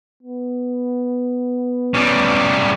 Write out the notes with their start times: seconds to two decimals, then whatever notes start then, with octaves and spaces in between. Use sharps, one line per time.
0.23 B3
1.94 C#3 G3